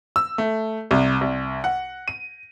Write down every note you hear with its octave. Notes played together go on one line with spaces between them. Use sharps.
E6
A3
C2
C2
F#5
D#7